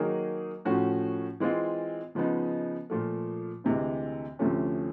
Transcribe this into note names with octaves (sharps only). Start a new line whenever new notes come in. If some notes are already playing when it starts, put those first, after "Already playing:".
Already playing: D#3 F#3 A#3 D#4 G#4
A2 F3 A3 C#4 F#4
E3 G#3 C4 F4
C#3 F3 G#3 B3 D#4
A#2 F3 A3
D2 C3 E3 G#3
D2 C3 F3 A3 C#4